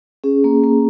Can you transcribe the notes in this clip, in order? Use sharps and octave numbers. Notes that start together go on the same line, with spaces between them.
C#4 G#4
A#3
A#3